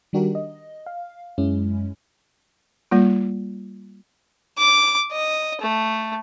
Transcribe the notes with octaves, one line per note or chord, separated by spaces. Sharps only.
D#3 G3 D4 F#4 G4 A#4
D#5
F5
F#2 G#3 C#4 E4
G3 A#3 F4
D6
D#5
A3